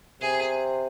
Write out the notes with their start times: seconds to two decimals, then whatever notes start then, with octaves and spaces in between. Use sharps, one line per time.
0.21 C3 G#4